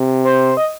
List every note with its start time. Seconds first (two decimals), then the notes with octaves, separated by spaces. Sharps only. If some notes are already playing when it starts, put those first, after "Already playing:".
Already playing: C3
0.24 C5
0.57 D#5